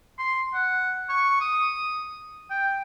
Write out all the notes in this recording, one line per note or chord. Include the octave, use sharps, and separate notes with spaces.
C6
F#5
C#6
D#6
G5